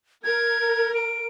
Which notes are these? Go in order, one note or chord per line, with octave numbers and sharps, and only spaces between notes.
A#4 G#6
D7